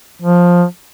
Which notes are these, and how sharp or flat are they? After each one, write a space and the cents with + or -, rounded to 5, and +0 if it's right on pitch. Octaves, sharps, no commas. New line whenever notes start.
F3 +10